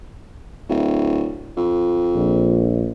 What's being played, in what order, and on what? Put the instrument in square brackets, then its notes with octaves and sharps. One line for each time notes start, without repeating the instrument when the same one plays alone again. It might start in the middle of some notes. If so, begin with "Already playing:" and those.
[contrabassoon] D1
F2
[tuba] A#1